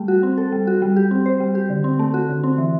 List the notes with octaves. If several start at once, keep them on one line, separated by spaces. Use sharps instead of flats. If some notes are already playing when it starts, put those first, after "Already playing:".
Already playing: G3 A3
F#4
C4
A4
G3
F#4
G3
G4
C4
C5
G3
G4
D3
C4
A3
F#4
D3
C4
E3